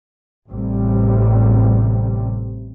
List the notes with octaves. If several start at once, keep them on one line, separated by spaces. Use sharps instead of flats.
A1 C3 G3